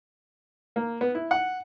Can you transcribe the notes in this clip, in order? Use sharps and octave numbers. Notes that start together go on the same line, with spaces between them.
A#3
B3
E4
F#5